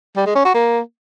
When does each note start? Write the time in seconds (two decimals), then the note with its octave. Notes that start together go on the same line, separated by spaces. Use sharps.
0.17 G3
0.26 G#3
0.36 C#4
0.45 F#4
0.54 A#3